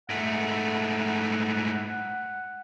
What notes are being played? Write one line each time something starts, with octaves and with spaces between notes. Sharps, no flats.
G#2 A3 F#5